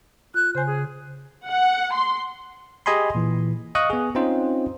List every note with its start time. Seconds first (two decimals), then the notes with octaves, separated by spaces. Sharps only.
0.34 F4 F#6
0.55 C#3 C5 G#5
0.66 G#4
1.48 F#5
1.94 C6
2.86 G4 G#4 D#5 G#5 B5 C6
3.15 A#2 E3
3.75 D#5 F5 C#6 D#6 F#6
3.90 B3 G#4
4.15 C4 C#4 D#4 F4 C5